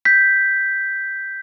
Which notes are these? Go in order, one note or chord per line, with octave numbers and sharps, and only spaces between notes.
G6 B6